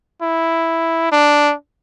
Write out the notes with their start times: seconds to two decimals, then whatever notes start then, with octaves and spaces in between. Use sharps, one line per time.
0.22 E4
1.12 D4